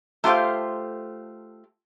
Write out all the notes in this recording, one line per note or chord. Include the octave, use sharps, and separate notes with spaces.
A3 F4 G4 C5 F5